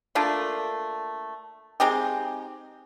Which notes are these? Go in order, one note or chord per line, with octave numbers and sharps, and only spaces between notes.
A3 A#3 D4 F4
G#3 C4 D#4 G4